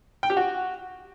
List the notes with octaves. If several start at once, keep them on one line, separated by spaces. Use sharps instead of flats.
G5
G4
F#4